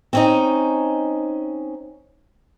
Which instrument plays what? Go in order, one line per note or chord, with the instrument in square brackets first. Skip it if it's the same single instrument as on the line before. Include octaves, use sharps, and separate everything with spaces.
[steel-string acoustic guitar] C4 C#4 D#4